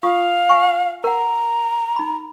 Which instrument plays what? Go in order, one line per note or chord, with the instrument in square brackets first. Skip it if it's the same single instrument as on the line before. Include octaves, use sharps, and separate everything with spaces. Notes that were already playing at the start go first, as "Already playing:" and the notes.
[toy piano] F4 C#6 D#6 [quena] F5
[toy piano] E5 G#5 C#6
[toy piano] A#4 F#5 [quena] A#5
[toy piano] D#4 B5